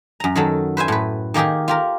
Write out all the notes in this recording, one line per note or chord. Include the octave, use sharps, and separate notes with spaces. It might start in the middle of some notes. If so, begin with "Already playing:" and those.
F#2 A#5
D#3 F#3 A4
B4 C5 E5 G#5
A2 B4
D#3 A#3 G4 G#4 A#4
F4 G4 A#4